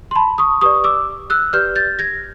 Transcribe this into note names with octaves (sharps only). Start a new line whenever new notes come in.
C6
A5 B5
C#6 D#6
G4 B4 D5 C#6 D#6
D6 E6
E6 F#6
G4 B4 D5 F6 G6
G6 A6
G#6 A#6